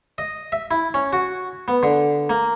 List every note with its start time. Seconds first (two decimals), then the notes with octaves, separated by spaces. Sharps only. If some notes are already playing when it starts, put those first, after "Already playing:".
0.18 D#5
0.52 E5
0.71 E4
0.94 C#4
1.13 F#4
1.68 B3
1.83 D3
2.30 A#3